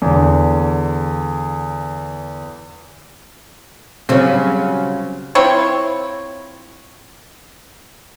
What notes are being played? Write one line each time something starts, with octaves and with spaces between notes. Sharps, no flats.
E2 D3
C#3 F#3 G3 C4 C#4
C4 E4 F4 C#5